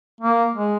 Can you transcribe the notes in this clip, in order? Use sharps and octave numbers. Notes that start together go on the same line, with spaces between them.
A#3
G#3